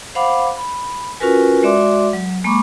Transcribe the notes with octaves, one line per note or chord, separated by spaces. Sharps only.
C5 F5 F#5 B5 D6
B5
C#4 F4 F#4 A#4 B4 G#5
G#3 F#4 D5 E5 C6 D6
F#3
G#3 A#3 B5 C#6 D6